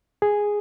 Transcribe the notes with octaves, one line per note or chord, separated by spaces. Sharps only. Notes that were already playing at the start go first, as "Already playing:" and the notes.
G#4